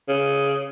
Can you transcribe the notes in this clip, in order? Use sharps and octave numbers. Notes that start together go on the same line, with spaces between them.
C#3